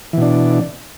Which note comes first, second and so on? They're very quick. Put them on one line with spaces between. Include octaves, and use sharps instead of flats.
E3 B2 D4